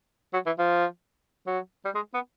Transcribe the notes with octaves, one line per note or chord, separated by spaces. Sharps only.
F#3
E3
F3
F#3
G3
G#3
B3